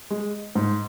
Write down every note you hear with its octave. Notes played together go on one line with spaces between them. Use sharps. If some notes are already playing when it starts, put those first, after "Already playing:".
G#3
G#2